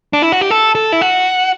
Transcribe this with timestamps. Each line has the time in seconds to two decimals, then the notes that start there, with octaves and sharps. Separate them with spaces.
0.13 D4
0.22 E4
0.32 F#4
0.41 G4
0.50 A4
0.75 A4
0.92 E4
1.01 F#4